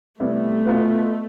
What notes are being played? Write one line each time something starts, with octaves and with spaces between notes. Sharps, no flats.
C3 G3 A3 B3 E4
B2 B3 F4 B4